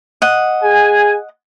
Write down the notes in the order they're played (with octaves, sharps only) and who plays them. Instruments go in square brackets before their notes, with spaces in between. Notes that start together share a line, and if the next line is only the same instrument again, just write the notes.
[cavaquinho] D#5 F#5
[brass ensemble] G#4 G#5